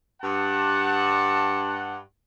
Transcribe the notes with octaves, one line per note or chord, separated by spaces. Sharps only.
G2 F#5 A5